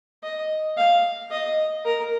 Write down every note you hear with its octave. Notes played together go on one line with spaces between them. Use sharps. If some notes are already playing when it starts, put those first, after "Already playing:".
D#5
F5
D#5
A#4